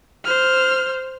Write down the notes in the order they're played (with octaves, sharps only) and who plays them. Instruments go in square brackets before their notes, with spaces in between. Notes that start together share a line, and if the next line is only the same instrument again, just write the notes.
[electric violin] C5 F6